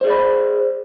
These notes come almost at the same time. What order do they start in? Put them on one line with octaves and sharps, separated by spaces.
C5 G#4 D5 B5